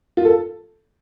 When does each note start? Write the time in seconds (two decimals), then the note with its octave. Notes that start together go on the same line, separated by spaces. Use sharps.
0.17 F4
0.25 A4